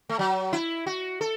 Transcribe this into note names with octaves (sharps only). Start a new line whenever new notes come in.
A3
F#3
E4
F#4
A4